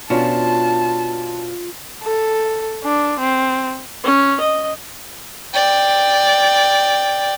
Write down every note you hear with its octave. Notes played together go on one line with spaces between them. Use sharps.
B2 C#4 D4 F4 A5
A4
D4
C4
C#4
D#5
D5 G5